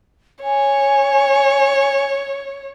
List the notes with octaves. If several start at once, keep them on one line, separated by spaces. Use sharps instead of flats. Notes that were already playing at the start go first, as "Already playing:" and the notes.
C#5 G#5